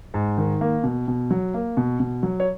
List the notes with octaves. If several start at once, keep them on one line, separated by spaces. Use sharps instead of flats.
G#2
D#3
A#3
B2
B2
F#3
A#3
B2
B2
F#3
C#5